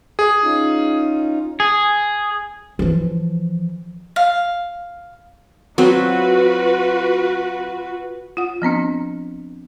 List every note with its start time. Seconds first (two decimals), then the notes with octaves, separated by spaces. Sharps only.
0.19 G#4
0.44 C#4 D#4 F4
1.60 G#4
2.79 E3 F3
4.16 F5
5.78 F#3 C4 F4 F#4 B4
8.37 F4 F#5
8.62 F3 B3 C4 D4